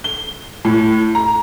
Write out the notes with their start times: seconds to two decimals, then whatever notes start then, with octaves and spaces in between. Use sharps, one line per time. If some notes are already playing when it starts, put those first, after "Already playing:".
0.04 G7
0.65 A2
1.15 A#5